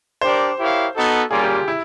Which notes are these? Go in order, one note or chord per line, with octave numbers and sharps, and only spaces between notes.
D4 G4 A#4 C5 D5
E4 G4 A#4 C#5 F5
B3 D#4 F#4 A4
G3 A#3 C#4 F4 G#4
G4
G4
E4